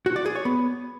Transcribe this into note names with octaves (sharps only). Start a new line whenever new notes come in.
F#4
D5
G#4
C#5
B3